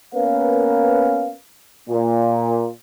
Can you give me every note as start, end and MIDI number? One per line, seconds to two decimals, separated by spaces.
0.15 1.32 58
0.15 1.32 59
0.15 1.32 61
0.15 1.32 70
0.15 1.32 71
0.15 1.32 77
1.89 2.68 46